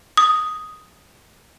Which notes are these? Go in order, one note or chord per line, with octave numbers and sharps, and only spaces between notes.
D#6